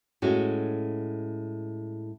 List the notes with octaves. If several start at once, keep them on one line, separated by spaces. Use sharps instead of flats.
A2 G#3 C#4 F#4